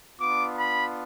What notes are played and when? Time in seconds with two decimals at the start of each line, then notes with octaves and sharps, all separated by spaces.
0.19 B3 D4 F4 D6
0.57 B5